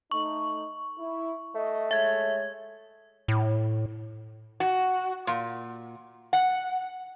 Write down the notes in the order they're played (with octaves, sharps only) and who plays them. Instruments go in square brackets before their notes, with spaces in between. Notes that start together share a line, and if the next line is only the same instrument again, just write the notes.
[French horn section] A3 D#4 [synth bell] C#6
[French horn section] E4
[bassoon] A3 [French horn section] D#5
[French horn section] G#3 C#5 [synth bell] E5 G#6
[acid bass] A2
[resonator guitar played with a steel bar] F#4
A#2
F#5